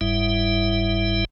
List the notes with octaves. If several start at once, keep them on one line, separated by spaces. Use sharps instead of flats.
F#1 G#2 G3 E4 E5